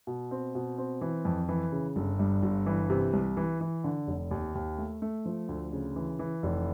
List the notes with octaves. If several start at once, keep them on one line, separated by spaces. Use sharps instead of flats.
B2
C4
B2
C4
E3
F2
E3
C#3
G1
G2
G1
E3
C3
C2
E3
E3
D3
F1
D#2
D#2
A3
A3
F3
D2
C#3
E3
E3
F1